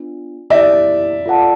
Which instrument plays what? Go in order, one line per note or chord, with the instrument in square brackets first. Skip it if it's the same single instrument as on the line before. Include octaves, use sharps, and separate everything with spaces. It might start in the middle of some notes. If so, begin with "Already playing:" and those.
Already playing: [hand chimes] B3 D4 F4
[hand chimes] B3 E4 G4 [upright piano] D5 E5
[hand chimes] F4 A4 D5 F#5 A5